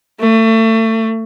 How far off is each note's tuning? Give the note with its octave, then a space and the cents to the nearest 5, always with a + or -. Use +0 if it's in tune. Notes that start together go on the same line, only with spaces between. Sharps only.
A3 +30